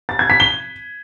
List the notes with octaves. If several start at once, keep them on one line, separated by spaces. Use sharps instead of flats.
A6
G#6
B6
G7